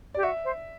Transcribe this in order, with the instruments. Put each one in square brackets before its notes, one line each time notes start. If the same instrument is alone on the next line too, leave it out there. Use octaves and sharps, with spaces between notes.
[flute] G4 [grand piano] D5
[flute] F#4 [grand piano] E5
[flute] C5